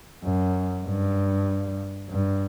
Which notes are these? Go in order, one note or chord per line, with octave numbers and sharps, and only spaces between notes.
F#2
G2
G2